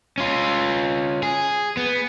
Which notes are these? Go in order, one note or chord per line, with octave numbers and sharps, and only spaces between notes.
C#4 F4
G#4
B3